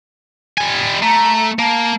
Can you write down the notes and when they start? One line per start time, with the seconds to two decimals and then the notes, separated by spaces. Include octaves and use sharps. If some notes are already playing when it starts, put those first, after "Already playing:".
0.58 G3 G#5
1.03 A3 A#5
1.59 A#3 A5